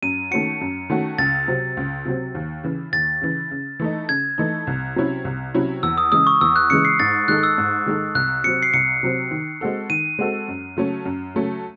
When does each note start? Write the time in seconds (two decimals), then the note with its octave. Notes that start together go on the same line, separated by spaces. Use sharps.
0.02 F#2 D#7
0.31 D#3 A3 C#4 F#4 C#7
0.61 F#2
0.90 D#3 A3 C#4 F#4
1.18 C#2 A6
1.48 C3 F#3 C4
1.77 C#2
2.05 C3 F#3 C4
2.35 D#2
2.64 C#3 E3
2.92 D#2 A6
3.22 C#3 E3
3.51 C#3
3.80 E3 A3 D#4
4.09 C#3 G#6
4.38 E3 A3 D#4
4.67 C2
4.96 C3 F#3 C#4 E4
5.25 C2
5.54 C3 F#3 C#4 E4
5.83 E2 E6
5.98 D#6
6.12 C#3 E3 G#3 D#6
6.27 C#6
6.41 E2 E6
6.56 F#6
6.70 C#3 E3 G#3 C#7
6.85 C7
7.00 G#2 A6
7.28 D#3 G#3 D#4 A4 F#6
7.43 E6
7.58 G#2
7.86 D#3 G#3 D#4 A4
8.15 C2 F#6
8.44 C3 F#3 C4 C#7
8.62 C7
8.73 C2 C#7
9.03 C3 F#3 C4
9.31 D#3
9.61 G#3 C4 F#4 A4
9.90 D#3 D#7
10.19 G#3 C4 F#4 A4
10.48 F#2
10.77 C#3 F#3 A3 C#4
11.05 F#2
11.35 C#3 F#3 A3 C#4